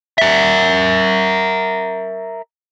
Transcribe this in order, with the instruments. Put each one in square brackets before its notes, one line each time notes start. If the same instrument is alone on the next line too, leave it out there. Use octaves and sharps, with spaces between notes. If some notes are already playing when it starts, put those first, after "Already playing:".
[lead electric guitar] A#4 E5